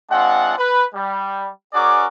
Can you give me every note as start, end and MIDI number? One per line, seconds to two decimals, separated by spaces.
0.10 0.56 56
0.10 0.56 60
0.10 0.56 62
0.10 0.56 65
0.10 0.56 78
0.58 0.85 71
0.95 1.48 55
1.74 2.06 61
1.74 2.06 66
1.74 2.06 68
1.74 2.06 70
1.74 2.06 74
1.74 2.06 86